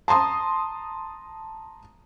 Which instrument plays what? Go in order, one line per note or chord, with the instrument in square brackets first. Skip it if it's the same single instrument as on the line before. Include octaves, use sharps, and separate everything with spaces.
[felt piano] A5 A#5 C6 D#6